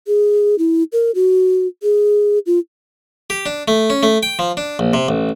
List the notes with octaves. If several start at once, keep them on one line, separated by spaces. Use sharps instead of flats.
G#4
E4
A#4
F#4
G#4
F4
G4
D4
A3
C#4
A3
G5
F3
D4
A#1
C3
A1